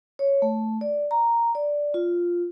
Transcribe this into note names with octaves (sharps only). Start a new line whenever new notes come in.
C#5
A3
D5
A#5
D5
F4